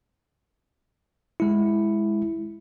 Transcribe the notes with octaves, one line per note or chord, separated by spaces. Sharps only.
G#3 E4